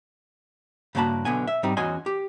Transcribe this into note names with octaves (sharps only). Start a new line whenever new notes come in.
G2 C#3 A#3 F#4 A5 B5
B1 D3 B3 G#5
E5
G#2 G3 C4 D#4
E2 C#4 F#4 D#5 G#5 C6
G4